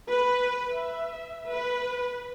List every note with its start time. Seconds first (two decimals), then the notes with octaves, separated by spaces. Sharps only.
0.11 B4
0.69 E5
1.51 B4